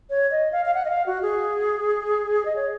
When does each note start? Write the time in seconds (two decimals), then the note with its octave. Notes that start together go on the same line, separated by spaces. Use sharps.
0.10 C#5
0.31 D#5
0.52 F5
0.65 F5
0.74 F#5
0.85 D#5
0.90 F5
1.06 F#4
1.22 G#4
2.45 D#5
2.56 C#5